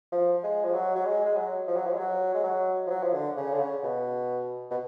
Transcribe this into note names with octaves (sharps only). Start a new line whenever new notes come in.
F3
G#3
F3
F#3
F#3
G#3
G#3
F#3
F3
F#3
F3
G#3
F#3
G#3
F#3
F3
F#3
F3
D3
C#3
D3
C#3
B2
B2